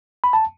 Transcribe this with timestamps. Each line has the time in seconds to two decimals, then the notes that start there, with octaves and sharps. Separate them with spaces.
0.24 B5
0.33 A5